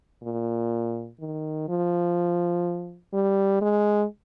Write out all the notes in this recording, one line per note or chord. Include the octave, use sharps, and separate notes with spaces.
A#2
D#3
F3
G3
G#3